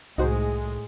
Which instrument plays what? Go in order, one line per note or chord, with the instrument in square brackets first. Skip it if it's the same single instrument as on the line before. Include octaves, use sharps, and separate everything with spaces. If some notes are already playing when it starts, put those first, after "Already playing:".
[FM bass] C2 [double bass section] A2 G#3 [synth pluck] D#4 F#4 C5